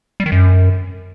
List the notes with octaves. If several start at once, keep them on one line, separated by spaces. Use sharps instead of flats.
G3
D#3
F#2